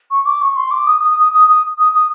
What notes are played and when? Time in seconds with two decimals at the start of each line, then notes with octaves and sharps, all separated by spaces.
0.11 C#6
0.25 D6
0.42 C#6
0.56 C6
0.71 D6
0.87 D#6
1.01 D#6
1.17 D#6
1.32 D#6
1.48 D#6
1.78 D#6
1.93 D#6